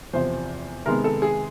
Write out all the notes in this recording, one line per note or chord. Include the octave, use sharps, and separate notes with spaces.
E2 C3 F3 C5
C3 D#3 G#3 B3 A#4
A4
G#4